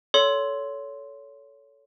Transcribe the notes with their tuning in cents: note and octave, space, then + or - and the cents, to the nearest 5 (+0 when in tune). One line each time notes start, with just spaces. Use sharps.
A4 -5 C#5 +25 C6 +0